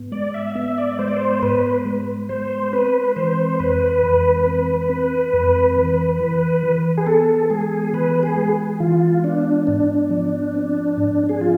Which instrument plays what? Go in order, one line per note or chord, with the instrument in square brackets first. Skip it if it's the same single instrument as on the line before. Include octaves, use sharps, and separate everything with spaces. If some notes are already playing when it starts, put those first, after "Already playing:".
Already playing: [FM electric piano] G#2 B3
[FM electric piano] G#3 [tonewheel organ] D5
[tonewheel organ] E5
[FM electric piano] B3 [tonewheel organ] E5
[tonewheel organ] D5
[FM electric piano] G#3 [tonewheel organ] C5
[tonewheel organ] D5
C5
[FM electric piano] G#2 [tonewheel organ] B4
[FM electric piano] G#3
[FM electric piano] G#3 [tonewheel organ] C5
[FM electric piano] C4 [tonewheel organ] B4
[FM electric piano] E3 [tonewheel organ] C5
[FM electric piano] F2 [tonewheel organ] B4
[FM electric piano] F2
C4
C4
F2
E3
E3
E3
[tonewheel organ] G#4
[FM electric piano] B3 [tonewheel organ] A4
[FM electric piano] G#3 [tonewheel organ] G#4
[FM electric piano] E3 [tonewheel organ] B4
[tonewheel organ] G#4
[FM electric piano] G#3
[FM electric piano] E3 [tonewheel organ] F4
[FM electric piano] B3 [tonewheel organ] D4
[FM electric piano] G#2 [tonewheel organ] D4
[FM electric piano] F3
C4
G#2
[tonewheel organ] G#4
[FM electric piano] F3 [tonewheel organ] F4